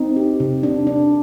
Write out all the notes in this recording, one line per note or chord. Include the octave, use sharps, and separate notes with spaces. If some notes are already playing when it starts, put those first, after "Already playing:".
Already playing: C4 D#4
G4
C3
D4
D4